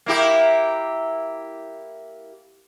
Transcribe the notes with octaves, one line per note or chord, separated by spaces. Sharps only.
A#3 E4 G4